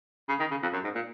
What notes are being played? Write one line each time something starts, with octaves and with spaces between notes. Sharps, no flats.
C#3
D#3
C#3
F2
F#2
G#2
A#2